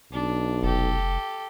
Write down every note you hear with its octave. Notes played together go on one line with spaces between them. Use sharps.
B1 D4
F1 G4 A4